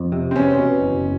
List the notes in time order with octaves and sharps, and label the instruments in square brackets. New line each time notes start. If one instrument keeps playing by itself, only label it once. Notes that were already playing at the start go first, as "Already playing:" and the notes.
Already playing: [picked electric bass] F2
C3
[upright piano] C4
[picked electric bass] E2 [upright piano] C#4
[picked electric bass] B2
F#1